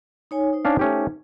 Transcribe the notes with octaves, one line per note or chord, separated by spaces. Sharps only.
D#4 C#5 G#5
D#4 C5
C#4 D4 F5
A3 C#4 G4